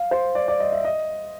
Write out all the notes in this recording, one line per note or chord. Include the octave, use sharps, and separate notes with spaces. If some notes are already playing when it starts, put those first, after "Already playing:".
Already playing: F5
C5
D5
D5
D#5
E5
D#5